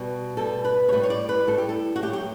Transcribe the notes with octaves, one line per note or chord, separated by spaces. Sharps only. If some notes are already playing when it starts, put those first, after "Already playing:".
Already playing: B2 G3
B2 G3 A4
B4
C#5
A2 G3 B4
C#5
D5
B4
A2 G3 A4
G4
A4
F#4
A2 F#3 G4
G4